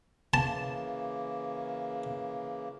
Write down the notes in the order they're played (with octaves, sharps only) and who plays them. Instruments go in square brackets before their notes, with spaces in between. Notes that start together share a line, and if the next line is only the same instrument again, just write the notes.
[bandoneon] C#3 E3 A#3 [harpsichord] A5